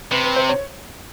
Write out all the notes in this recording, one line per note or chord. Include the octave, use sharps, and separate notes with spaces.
C3 B4
B4
C5
C#5